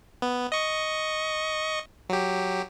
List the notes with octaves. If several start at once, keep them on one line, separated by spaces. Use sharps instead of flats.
B3
D#5 C#6
F#3 G4